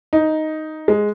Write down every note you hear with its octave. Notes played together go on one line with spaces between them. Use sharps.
D#4
G#3